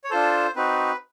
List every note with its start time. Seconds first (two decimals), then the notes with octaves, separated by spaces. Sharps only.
0.04 C#5
0.10 D4 F4 A4 C5
0.56 C4 D#4 F#4 B4